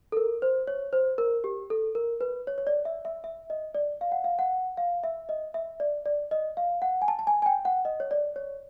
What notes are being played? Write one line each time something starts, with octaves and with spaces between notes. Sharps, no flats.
A4
A#4
C5
C#5
C5
A#4
G4
A4
A#4
B4
C#5
C#5
D5
E5
E5
E5
D#5
D5
F5
F#5
F5
F#5
F5
E5
D#5
E5
D5
D5
D#5
F5
F#5
G#5
A5
A5
G#5
G#5
G5
F#5
D#5
C#5
D5
C#5